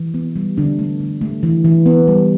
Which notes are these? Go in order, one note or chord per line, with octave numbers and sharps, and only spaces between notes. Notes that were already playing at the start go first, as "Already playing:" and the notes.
Already playing: E3
B3
G3
D3 D4
A3
D3
A3
E3
E3
B3
G3